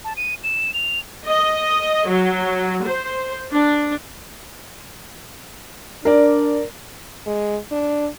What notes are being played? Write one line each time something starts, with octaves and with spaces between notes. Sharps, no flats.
A5
D#7
E7
F7
D#5
F#3
C5
D4
D4 A#4 D5
G#3
D4